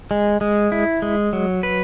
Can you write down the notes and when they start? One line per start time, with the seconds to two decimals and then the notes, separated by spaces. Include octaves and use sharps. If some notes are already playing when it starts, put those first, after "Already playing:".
0.11 G#3
0.41 G#3
0.72 E4
1.02 G#3
1.33 F#3
1.63 B4